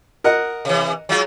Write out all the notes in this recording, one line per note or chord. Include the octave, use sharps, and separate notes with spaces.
A#4 D#5 F#5
C3 E3
F#3 G#3 F4